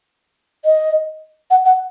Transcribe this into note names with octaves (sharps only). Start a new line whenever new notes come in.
D#5
F#5
F#5